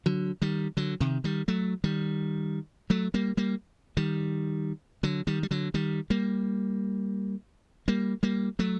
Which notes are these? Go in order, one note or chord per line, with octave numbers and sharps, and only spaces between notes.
D3 F#3
D#3 G3
D3 F#3
C3 D#3
D#3 G3
F#3 A3
D#3 G3
F#3 A3
G3 A#3
G3 A#3
D#3 G3
D3 F#3
D#3 G3
G3
D3 F#3
D#3 G3
G3 A#3
G3 A#3
G3 A#3
F#3 A3